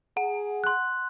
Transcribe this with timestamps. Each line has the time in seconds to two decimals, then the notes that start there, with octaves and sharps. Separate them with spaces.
0.17 G#4 F#5
0.64 C6 F#6